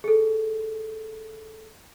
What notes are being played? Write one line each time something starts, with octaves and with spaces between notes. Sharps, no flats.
G#4 A4